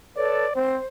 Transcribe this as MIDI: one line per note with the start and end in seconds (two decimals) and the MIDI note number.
0.17 0.45 69
0.17 0.45 71
0.17 0.45 73
0.17 0.54 74
0.56 0.78 60
0.56 0.88 72